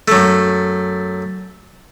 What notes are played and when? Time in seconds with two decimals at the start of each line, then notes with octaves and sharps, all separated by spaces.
0.08 F#2 A3